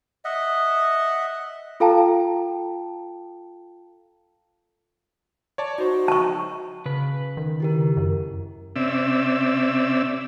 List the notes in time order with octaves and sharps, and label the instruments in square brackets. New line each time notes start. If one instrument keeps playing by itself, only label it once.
[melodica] D#5 E5 F#5
[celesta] F4 A4 F5 G5 A5 A#5
[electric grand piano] C#5 D5 A5
[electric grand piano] D#4 C5 [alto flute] F#4
[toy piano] A5 C#6
[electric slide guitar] C#3 B4
[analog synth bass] D#3
[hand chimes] E4 G4 A#4
[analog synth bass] F#2
[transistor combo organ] C3 C4 C#4 D5 E5 E6